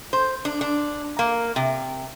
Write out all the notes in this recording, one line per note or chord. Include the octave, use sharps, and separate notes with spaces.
C5
D4
D4
A#3
C3